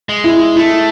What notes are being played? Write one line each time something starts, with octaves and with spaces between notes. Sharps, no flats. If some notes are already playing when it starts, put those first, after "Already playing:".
G#3
E4
A3 E4